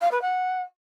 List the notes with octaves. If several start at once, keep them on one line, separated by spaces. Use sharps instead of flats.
F5
B4
F#5